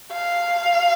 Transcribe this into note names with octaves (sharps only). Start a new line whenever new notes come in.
F5